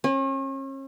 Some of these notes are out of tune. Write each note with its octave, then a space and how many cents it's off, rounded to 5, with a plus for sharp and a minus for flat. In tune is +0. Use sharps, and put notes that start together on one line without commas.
C#4 -40